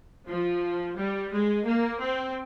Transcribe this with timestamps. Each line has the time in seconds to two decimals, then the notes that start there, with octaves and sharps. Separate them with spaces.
0.28 F3
0.98 G3
1.32 G#3
1.66 A#3
2.01 C4